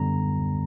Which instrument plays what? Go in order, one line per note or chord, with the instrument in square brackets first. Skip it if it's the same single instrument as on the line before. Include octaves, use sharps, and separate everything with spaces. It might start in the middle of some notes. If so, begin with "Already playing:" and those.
Already playing: [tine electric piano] F#2 D3 G3 B3 A#5